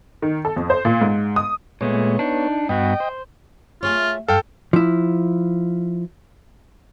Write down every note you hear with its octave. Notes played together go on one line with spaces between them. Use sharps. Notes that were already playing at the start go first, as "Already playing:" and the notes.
D#3
A4
F2
C5
A#2
G#2
D#6
A#2 G#3 A3 B3 C#5
D4 D#4
G2 B3 F#4 D#5 G5
C5
A3 F4 G#4 C#5
G2 A4 F5 G5
F3 E4